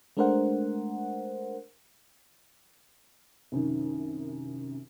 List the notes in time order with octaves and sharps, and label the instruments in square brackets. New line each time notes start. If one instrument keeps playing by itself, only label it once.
[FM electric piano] G#3 A3 D4 A#4 C5 F#5
[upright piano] C2 F#2 D#3